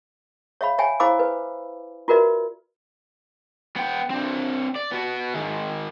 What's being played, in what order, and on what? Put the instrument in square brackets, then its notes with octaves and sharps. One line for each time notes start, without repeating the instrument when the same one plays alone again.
[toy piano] C#5 E5 F5 B5
C#5 E5 G5 G#5 B5
E4 C5 F5 B5 D6 E6
B4
F4 F#4 A#4 B4 D5 E5
[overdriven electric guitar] B3 G5
C4 D4
D5
B3 F#4
D#3 G#3